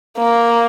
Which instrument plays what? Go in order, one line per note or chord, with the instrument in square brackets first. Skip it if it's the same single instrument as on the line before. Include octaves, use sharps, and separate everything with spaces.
[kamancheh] A#3